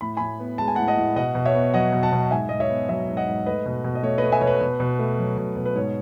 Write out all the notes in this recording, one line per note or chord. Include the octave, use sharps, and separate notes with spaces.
A2 B5
A2 G#5 B5
B3
G#3 A5
G#5
F#5 A5
A2
D#5 F#5
A2
B2 D#5 F#5
B2
C#5 E5
B3
F#3 D#5 F#5
B2
F#5 A5
B2
G#2 E5 G#5
G#2 D#5
C#5 E5
B3
F#3 C#5 E5
G#2
D#5 F#5
G#2
A3 B4 D#5
B2
B2
D#5
A3 C#5
B4 D#5
A3
E5 G#5
B2 C#5
B4
B2
B2
A3
F#3
B2
B2
B4
G#2 C#5